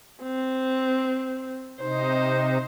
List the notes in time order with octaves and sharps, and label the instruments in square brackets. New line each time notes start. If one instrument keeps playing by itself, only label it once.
[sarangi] C4
[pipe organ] C3 D#4 [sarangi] C5